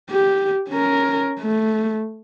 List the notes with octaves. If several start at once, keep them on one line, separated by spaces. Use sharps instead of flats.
G4
C#4 A#4
A3